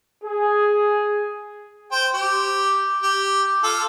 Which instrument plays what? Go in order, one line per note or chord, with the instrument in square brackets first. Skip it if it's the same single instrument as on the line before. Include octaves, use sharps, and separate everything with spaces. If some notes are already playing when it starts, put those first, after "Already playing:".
[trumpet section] G#4
[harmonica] C5 G5
G4
G4
F4 A4